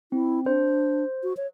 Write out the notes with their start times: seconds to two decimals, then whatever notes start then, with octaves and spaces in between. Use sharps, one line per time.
0.12 C4 E4
0.46 D4 C5
1.23 F#4
1.37 C#5